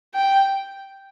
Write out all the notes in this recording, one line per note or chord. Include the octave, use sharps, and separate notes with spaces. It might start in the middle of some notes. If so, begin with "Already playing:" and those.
G5